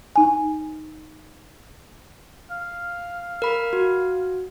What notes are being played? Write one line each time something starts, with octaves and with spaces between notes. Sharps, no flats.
D#4 G#5
F5
A#4 B5
F#4